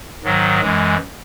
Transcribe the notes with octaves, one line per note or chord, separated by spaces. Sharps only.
G#2 D#3 F#3
F#2 E3 G#3